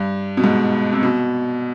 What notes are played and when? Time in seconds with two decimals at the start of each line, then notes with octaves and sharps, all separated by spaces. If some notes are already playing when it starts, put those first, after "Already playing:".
Already playing: G2
0.37 B2
0.44 G#2
0.92 C3
1.03 B2